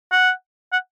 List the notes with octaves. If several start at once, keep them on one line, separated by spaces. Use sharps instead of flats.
F#5
F#5